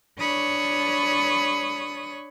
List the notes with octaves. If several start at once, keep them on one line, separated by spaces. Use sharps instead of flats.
D4 C#5 B5 C#6 D#6